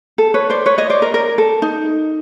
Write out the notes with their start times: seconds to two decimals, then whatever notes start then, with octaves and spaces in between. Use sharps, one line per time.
0.18 A4
0.34 B4 C#5
0.50 C5 D5
0.66 B4 C#5
0.78 C#5 D#5
0.90 C5 D5
1.02 A#4
1.14 A#4
1.38 A4
1.62 D#4